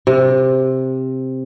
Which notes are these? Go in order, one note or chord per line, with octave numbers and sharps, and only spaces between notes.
C3